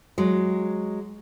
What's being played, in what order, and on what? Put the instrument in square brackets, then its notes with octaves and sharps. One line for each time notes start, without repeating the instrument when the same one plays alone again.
[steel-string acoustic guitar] F#3 G#3